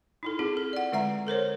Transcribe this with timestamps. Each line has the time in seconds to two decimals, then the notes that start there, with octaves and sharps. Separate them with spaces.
0.23 D#4 E4 A4
0.39 C4 F4 G#4
0.57 A4
0.73 D5 F#5
0.92 D3 G#3 E5 F#5 A#5
1.27 A4 A#4 C5 C#5